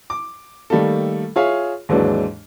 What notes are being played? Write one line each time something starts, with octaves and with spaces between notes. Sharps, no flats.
D6
D#3 G3 A3 A#3 A4
F4 G#4 C#5 E5 F5
D#2 G#2 E3 F#3 G#3 D4